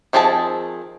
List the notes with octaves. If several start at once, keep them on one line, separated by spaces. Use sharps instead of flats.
D#3 F3 C4 G#4 A5